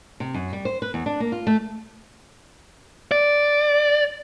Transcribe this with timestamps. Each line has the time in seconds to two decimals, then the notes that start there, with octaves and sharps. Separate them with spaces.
0.20 C3
0.34 F#2
0.53 G3
0.65 C5
0.82 B4
0.94 E2
1.06 D4
1.20 A#3
1.32 F4
1.47 A3
3.11 D5